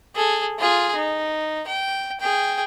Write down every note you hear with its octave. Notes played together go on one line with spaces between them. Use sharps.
G#4 A4
F4 G#4
D#4
G5
G#4 G5